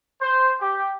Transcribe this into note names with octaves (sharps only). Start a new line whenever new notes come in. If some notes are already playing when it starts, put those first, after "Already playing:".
C5
G4